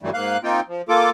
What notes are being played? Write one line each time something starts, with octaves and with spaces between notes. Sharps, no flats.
G2 D3 E3 F#3 G3 A3
G#2 A#3 F5 F#6
A#3 C4 D#4 F4 G5
F3
A#3 F4 A4 D6